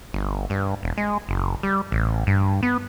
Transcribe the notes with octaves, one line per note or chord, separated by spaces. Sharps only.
G1
G2
E1
G#3
F#1
G3
A1
G2
B3